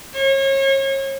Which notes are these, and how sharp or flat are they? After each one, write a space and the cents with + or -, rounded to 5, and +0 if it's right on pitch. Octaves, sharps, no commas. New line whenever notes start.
C#5 -35